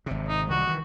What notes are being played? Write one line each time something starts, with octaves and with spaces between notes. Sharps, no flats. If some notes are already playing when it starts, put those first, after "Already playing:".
G#1 C3
D#4
C2 D#3 G3 F#4
D#3 E3